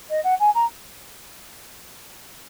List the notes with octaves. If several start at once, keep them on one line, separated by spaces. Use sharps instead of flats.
D#5
F#5
G#5
A#5